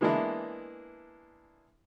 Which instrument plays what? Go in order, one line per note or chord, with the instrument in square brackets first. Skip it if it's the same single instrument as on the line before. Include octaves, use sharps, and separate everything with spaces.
[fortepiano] E3 G#3 A#3 B3 D4 E4